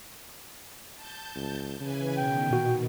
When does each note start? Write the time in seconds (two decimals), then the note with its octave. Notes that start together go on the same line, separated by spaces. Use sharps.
0.95 A5 G6
1.36 C#2
1.80 C#3 E3 B4 G#5
2.17 B2 D#3 G5
2.50 A#2 F#4